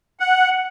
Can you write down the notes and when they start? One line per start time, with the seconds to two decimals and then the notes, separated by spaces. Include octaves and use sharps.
0.20 F#5